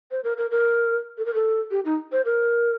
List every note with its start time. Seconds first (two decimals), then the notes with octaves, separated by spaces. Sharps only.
0.11 C5
0.24 A#4
0.37 A#4
0.51 A#4
1.18 A4
1.26 A#4
1.34 A4
1.71 G4
1.85 D#4
2.12 C5
2.25 A#4